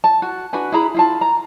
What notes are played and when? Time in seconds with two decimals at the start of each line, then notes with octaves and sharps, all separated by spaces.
0.04 A5
0.22 F#4
0.53 D4 F#4 B4 G#5
0.72 E4 G#4 A#5 B5
0.95 E4 F4 A5
1.21 A#5